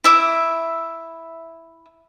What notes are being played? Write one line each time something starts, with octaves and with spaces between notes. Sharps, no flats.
E4 E5 D6